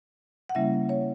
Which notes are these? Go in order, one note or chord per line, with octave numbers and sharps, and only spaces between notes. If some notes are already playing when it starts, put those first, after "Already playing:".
F#5
C#3 G3 A#3 C#4 E4 E5
C#5